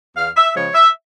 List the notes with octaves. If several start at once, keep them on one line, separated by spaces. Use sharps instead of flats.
E2 F5
E5
C#3 F3 G#3 C#5
E5